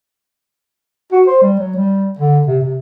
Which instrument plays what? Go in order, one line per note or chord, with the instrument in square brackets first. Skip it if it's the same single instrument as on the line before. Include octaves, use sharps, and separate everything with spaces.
[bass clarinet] F#4
C5
G3
F#3
G3
D3
C3
C3